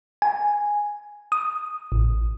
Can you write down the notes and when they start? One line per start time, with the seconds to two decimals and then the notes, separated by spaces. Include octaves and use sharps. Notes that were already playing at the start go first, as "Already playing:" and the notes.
0.22 G#5
1.32 D#6
1.92 A1